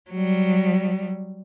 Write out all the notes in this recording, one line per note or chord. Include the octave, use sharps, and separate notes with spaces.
F#3 G3